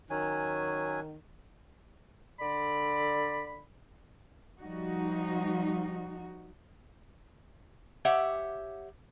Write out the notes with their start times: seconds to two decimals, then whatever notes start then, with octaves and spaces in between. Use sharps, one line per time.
0.10 D#3 F#3 C#4 G#5
2.40 D3 D5 B5
4.60 F3 G3 D#4 F#4
8.05 G4 C#5 E5 F#5